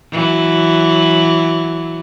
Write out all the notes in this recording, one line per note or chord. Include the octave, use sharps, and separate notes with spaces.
E3 F#3